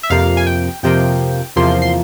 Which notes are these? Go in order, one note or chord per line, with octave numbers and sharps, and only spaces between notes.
E5
F2 C3 F3 A#3 F5
G#5
G5
F2 C3 F3 A#3 G5
E2 C3 F3 A#3 C6
C6